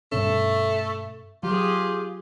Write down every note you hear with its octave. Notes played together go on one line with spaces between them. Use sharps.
G2 B2 A3 C#4
F#3 F4 G4 G#4